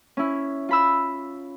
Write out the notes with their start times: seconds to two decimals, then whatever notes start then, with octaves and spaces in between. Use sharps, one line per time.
0.17 C#4 E4
0.69 F4 B5 E6